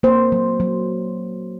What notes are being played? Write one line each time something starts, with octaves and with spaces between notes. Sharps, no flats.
A#3 C5
F#3
F#3